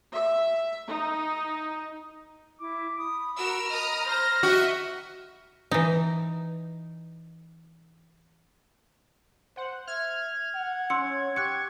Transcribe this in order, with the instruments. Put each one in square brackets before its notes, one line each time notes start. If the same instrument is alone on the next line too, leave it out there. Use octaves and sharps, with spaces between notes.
[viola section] E5
D#4
[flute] E4 [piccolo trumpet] D6
[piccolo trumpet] B5 [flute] D#6
[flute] F#4 [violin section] A#4 E6
[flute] D#5 [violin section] A#5 D#6 F6
[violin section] C5 A#5 A#6 [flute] F6
[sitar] F#4 [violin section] D#5 E5
[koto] E3 D#4
[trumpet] C5 [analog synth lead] F#5
[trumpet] E5 [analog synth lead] F6 [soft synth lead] G#6
[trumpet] F#5
[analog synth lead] C#4 [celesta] C6 E6 C#7
[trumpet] G4 [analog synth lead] C#6 [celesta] F#6 C#7